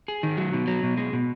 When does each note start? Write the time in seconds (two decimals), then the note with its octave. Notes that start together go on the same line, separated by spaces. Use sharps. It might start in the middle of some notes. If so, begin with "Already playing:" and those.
0.08 G#4
0.23 D#3
0.37 F#3
0.53 B2
0.67 F#3
0.83 B2
0.97 G#3
1.13 B2